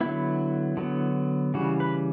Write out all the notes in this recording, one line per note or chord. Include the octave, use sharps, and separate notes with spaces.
D3 F#3 B3 E4
D3 F#3 B3
C#3 E3 G3 F#4
B4